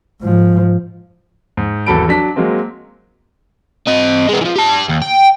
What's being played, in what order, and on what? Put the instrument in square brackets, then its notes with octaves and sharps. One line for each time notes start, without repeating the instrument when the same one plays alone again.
[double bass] G#2 F3
[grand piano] G#2
G#1 E2 F#3 A4 B5 D7
F#3 D4 B6
F#3 G#3 A#3 C4
[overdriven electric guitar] C4 D#5
G#3 B3
E3 F3
G4 A5
D#2
G5